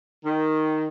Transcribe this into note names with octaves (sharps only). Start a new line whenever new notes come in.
D#3